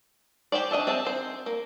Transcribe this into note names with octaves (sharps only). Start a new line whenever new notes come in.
G4 G#4 C5 D5
D4 D#5 E5 A5
C4 G#4 E5 A5
C4 C5
A#3